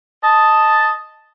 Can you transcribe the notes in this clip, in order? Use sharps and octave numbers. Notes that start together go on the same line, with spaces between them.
D#5 A5